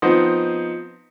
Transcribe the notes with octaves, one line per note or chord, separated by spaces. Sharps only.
F3 B3 C4 D#4 C5 D#5